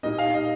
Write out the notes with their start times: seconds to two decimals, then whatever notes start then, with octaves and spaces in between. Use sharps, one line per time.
0.03 A#2 G3 A#3 D#4 D#5
0.18 F5
0.34 D#5